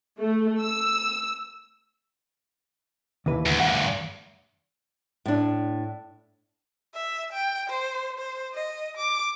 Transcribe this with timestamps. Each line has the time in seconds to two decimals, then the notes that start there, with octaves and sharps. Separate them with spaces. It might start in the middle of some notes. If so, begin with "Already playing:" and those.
0.20 A3
0.62 E6
3.26 D#2 E3 B4
3.46 D2
3.60 D2 G2 F#5
5.25 A2 D4
6.95 E5
7.33 G5
7.70 C5
8.19 C5
8.54 D#5
8.97 D6